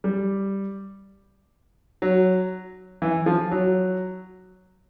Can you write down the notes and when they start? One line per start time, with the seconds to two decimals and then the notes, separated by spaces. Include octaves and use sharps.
0.04 G3
2.02 F#3
3.02 E3
3.26 F3
3.51 F#3